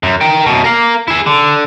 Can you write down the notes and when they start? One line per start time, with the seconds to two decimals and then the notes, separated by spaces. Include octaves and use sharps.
0.03 F#2
0.21 A#4 G5
0.46 F#2 B2
0.64 A#4 F5
1.08 E4 G#4
1.26 D3